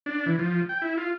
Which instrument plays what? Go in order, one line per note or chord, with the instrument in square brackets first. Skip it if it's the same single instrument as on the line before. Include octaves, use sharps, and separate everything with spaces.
[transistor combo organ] D4
E3
F3
G5
E4
F4